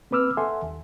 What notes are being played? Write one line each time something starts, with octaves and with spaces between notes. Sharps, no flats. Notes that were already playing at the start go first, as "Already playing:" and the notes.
A#3 C4 B4 D6 E6 F6
A4 E5 F#5 G#5 C6
D#2